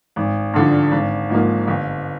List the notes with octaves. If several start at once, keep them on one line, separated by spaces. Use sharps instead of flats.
G#1
G2 D3 F3
G#1
G#2 F3 A#3
G1